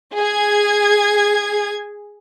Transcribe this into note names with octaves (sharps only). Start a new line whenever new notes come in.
G#4 G#6